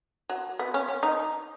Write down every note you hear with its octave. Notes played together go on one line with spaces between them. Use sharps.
F#3
B3
C#4
C#4
D#4